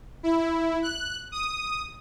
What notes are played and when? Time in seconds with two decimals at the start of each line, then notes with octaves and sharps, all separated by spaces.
0.23 E4
0.82 F#6
1.32 D#6